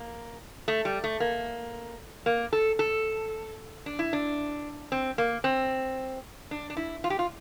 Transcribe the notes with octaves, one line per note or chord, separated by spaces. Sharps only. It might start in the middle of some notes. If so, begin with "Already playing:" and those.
Already playing: A#3
A3
G3
A3
A#3
A#3
A4
A4
D4
E4
D4
C4
A#3
C4
D4
D4
E4
F4
G4
F4